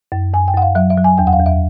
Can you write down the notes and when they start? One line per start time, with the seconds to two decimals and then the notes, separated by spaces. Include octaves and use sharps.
0.12 F#2
0.34 F#2 G#5
0.48 G5
0.54 F#2 F#5
0.62 F5
0.75 F#3 E5
0.90 E5
0.97 F#3
1.04 G#5
1.18 E2 G5
1.27 F#5
1.33 F5
1.39 E2
1.46 E5